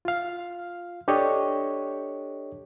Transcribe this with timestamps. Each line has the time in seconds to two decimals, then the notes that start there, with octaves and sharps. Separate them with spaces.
0.05 F4 F5
1.08 D4 G4 A4 C#5 D#5 C#6